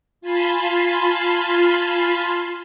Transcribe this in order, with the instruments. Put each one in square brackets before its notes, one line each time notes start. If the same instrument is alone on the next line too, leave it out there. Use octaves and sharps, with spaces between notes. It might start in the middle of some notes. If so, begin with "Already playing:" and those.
[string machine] F4 F5 G#5 A5 B5 C6